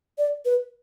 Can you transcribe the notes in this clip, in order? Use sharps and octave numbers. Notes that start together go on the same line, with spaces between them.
D5
B4